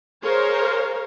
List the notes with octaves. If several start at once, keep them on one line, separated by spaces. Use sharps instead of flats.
G#4 A#4 C5 C#5 F5 A#5